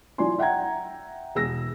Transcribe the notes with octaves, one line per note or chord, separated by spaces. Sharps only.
E3 F#3 F4 D5 G#5 C6
E5 F#5 G5 A#5 G#6
E1 G#4 E6 A#6